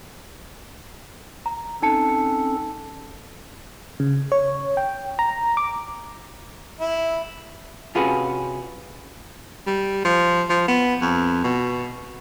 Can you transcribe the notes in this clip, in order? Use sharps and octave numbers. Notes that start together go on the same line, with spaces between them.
A#5
C4 C#4 D#4 A4 A5 C#7
C#3
C#5
G5
A#5
D6
E4
C3 C#4 F4 F#4 G#4 B4
G3
F3
F3
B3
F2
B2